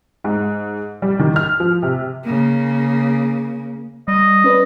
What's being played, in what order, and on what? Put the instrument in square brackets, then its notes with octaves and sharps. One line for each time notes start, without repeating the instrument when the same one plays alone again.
[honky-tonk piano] G#2
G3
D#3
F6
F3
C3
[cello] C#3 A#3
[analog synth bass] G3 [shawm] D#5
[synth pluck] C#4 B4 D5